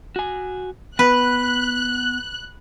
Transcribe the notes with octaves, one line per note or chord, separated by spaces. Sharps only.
F#4 G#5
B3 B4 F#6